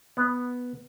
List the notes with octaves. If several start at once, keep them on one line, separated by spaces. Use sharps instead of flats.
B3